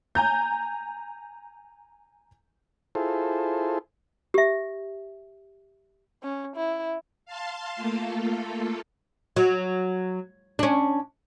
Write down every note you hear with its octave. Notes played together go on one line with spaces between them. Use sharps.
G#5 A#5 G6
E4 F4 G#4 A4 C5
G4 E5
C#4
E4
F5 A5 C6
A3 A#3 F4 A4
F#3
C#4 D4